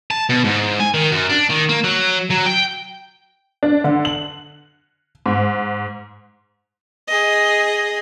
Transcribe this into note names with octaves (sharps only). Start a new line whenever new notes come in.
A5
B2
G#2
G#5
D#3
F#2
D4
D#3
A#3
F#3
F#3
G5
D4
D3
F#7
G#2
G#4 D#5